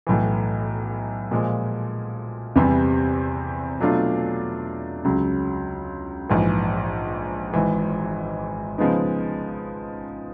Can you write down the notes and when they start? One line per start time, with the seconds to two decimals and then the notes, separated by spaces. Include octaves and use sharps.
0.07 B1 A2 E3
1.31 A#2 F3 G#3
2.56 E2 C3 E3 G3 C4
3.80 B2 F#3 A3 D4 F4
5.05 C#2 C#3 F#3
6.29 A#1 G#2 E3
7.54 G#1 G#2 E3
8.78 C#3 F3 G#3 B3 D#4